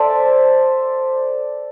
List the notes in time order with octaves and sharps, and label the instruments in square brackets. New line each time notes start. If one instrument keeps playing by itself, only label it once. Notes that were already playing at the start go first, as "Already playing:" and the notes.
Already playing: [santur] A4 C5 D5 E5